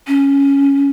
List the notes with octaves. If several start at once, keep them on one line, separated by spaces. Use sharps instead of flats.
C#4